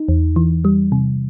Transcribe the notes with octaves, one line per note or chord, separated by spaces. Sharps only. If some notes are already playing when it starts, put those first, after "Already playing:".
Already playing: D#4
E2
E3
G3
C3